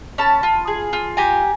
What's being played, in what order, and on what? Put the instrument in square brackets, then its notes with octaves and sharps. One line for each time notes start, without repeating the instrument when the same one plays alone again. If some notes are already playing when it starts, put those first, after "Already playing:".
[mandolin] C#4 A5 B5
F4
G#4
F4
G4 G#5 A#5